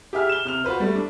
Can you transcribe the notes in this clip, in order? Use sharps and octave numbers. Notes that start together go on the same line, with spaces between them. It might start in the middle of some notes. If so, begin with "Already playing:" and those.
G4 G#4 E5 F6
E7 G7
C3 F6 F7
F4 F#4 B4 C5
G3 A3
D4